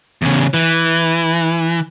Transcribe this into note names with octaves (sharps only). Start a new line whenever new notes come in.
E2 C#3
E3